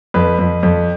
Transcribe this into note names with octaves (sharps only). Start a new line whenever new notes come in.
F2 B4
F2
F2